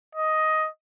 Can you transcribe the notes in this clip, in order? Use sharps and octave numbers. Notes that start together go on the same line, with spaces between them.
D#5